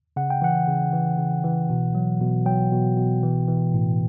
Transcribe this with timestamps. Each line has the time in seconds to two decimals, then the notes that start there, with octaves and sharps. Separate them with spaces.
0.16 C#3 F#5
0.30 G5
0.42 E3 F#5
0.68 C#3
0.93 E3
1.18 C#3
1.44 E3
1.70 B2
1.95 F#3
2.20 B2
2.46 F#3 G5
2.72 B2
2.97 B2
3.23 E3
3.48 E3
3.74 A2